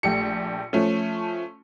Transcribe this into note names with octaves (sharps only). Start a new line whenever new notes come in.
A#1 A3 G4 C#7
F3 A3 C#4